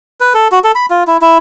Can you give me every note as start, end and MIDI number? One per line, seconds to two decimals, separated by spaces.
0.21 0.33 71
0.34 0.48 69
0.52 0.59 66
0.64 0.72 69
0.75 0.86 83
0.90 1.04 65
1.07 1.17 64
1.22 1.38 64